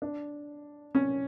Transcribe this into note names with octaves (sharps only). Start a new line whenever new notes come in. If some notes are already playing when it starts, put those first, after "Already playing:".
D4
C#4